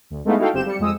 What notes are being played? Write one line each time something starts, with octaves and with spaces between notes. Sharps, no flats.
D2
G#3 A3 B3 D#4 E4 F5
D#4 E4 F#4 A4 F5 G5
G1 C4 G4 G6 E7
G3 C#7
F2 G#3 D#6 E6